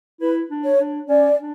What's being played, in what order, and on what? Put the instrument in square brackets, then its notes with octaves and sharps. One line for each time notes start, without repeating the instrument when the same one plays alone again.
[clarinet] E4 [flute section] B4
[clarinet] D4
[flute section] C#5
[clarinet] D4
[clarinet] C#4 [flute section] D5
[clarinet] D4